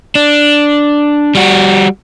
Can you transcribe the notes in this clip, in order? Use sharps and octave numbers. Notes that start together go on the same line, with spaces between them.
D4
G3 F#4